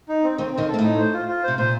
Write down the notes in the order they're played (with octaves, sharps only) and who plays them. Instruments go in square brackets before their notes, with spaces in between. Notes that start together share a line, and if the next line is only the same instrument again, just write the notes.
[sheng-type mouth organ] D#4
C4
[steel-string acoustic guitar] D#2 D#3 [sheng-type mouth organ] C4
[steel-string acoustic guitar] D#2 D#3 [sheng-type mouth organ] C4
[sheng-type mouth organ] A4
[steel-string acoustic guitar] A#3
[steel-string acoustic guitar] A2 A3 [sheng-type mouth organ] D#4
[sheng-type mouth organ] C5
F4
F4
[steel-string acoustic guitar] C3 [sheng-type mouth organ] C5
[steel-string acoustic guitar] A#2 [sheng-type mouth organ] C5